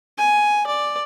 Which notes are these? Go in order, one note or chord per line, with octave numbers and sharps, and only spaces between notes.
G#5
D5